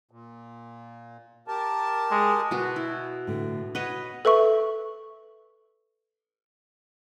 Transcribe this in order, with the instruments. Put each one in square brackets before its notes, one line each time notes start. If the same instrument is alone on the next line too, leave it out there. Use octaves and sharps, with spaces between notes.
[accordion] A#2
G4 A#4 A5
[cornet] G#3
[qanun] B2 F#4 [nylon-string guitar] B3
[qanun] E4
[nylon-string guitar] A2 D3
[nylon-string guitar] F#4 [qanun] B4 C#5 D#5
[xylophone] A4 B4 E5 C#6